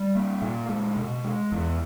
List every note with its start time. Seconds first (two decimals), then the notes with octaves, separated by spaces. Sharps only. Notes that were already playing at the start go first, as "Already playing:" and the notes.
Already playing: G3
0.15 A#3
0.42 A#2
0.69 G#3
0.96 B2
1.24 G#3
1.52 E2